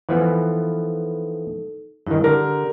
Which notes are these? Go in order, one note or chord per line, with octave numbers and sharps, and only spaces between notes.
E3 F3 B3 D#4 A4
G2 D#3 E4
D3 G4 A#4 A#5